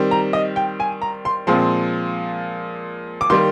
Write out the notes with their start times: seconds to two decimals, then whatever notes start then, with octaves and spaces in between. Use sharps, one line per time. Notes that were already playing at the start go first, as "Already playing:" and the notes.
Already playing: D#3 G3 C4
0.11 A#5
0.33 D#5
0.56 G5
0.80 G#5
1.02 A#5
1.25 C6
1.47 A#2 F3 G#3 C4 C6
3.21 D6
3.30 D#3 G3 A#3 C6